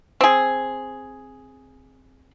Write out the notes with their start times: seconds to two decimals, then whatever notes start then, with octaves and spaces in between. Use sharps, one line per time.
0.21 C4 G#4